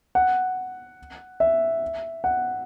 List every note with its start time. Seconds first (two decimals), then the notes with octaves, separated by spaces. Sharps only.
0.15 F#5
1.40 E5
2.24 F#5